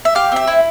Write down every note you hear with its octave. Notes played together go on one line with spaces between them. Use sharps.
E5
G4 F5
C4 E5
E4